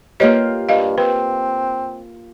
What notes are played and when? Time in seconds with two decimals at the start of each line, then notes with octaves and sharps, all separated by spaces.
0.20 A#3 F4 G4 B4 C#5 D#5
0.69 G2 D#5 F5
0.98 C4 B4